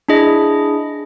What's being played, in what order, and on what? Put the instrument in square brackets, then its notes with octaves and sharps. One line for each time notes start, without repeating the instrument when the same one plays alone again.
[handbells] D4 E4 G#4 D#5